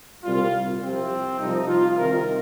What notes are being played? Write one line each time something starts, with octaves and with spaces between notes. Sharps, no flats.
C2 A#2 G3 F4
C2 C3 F3 C4
C2 C3 F3 D#4
F4
C2 C3 D#3 A#4